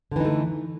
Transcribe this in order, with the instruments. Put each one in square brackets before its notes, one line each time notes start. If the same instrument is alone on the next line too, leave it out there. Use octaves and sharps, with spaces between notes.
[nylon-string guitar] D3
E3
D#4
A3